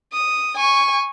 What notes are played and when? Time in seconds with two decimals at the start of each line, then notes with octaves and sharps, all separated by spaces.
0.13 D#6
0.56 G#5 C#6